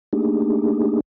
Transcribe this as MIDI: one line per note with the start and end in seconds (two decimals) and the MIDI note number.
0.13 1.00 57
0.13 1.00 58
0.13 1.00 62
0.13 1.00 63
0.13 1.00 67
0.13 1.00 68